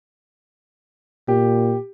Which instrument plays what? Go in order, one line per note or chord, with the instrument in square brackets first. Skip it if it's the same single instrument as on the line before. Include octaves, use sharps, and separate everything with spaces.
[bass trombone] A#2 [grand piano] G4